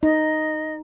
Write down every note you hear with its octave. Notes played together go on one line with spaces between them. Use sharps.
D#4 D#5